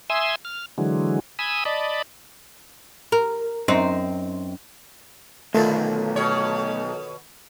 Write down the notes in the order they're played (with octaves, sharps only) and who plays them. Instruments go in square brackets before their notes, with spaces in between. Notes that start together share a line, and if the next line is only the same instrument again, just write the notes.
[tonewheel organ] E5 G#5 C6 D#6 E6
F6
D3 E3 F#3 G#3
G#5 B5 D#6 E6
D5 D#5 A5 B5
[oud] A#4
F#2 C4 D#4
[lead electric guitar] B1 [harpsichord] D3 D#3 F4 [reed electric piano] A3
[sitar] B2 C#5